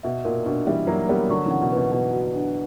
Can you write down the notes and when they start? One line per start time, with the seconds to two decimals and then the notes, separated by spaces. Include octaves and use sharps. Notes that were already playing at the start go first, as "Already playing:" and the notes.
0.03 B2 E5
0.25 A#2 A#4
0.46 B2 D4
0.67 E3 G3 E5
0.87 F#3 A#3 C#5
1.09 G3 B3 A#4
1.30 D3 F#3 C#6
1.46 C#3 E3 F#5
1.61 B2
1.72 B2 B4
1.92 B2 B4
2.13 F#4
2.35 D4